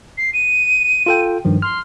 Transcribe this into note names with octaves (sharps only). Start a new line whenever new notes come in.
C7
D#7
F4 A4 G5
G2 D#3 F3
C6 F6